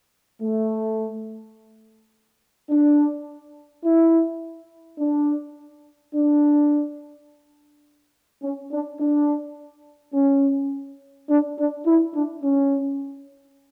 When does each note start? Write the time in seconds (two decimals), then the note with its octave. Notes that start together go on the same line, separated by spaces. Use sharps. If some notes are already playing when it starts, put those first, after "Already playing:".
0.41 A3
2.70 D4
3.84 E4
4.99 D4
6.14 D4
8.43 C#4
8.72 D4
9.00 D4
10.14 C#4
11.29 D4
11.58 D4
11.86 E4
12.15 D4
12.43 C#4